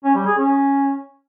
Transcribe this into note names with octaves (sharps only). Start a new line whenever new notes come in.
C#4
G3
G#4
C#4